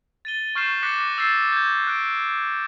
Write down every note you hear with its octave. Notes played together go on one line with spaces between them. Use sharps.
A6 D#7 G7
C#6 F6 G6 C7 E7
D6 F#6 A#6 B6 C#7 E7
E6 G6 A6 C7 C#7 E7
G6 G#6
F#6 D7